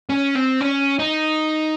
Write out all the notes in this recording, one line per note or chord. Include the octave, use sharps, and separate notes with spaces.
C#4
C4
C#4
D#4